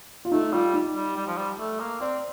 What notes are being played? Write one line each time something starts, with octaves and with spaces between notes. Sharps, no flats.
F4
A3 D#4
G3 F4
D#4
G3
G3
F3
G3
A3
A#3
C4 D5